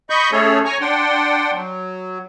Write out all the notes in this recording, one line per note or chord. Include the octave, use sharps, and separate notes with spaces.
D#5 B5 C#6 G6
A3 C#4 G#4 A4 C#5
C#5 G#5 A#5 C#6
D4 F#5 G5 C6
F#3